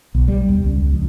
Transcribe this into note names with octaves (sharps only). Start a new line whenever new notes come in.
B1
G3
E2
C#2
F2